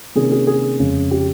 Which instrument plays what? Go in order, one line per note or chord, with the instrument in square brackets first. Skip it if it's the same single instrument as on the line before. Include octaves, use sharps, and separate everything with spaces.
[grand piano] C3 D#3 A#3 C#4 G#4
G#4
G#4
F2 C#3 G#3 C#4
G4